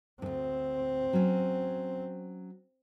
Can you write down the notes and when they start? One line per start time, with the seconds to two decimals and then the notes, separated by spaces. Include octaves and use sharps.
0.22 D2 G2 C4
1.13 F#3 C#4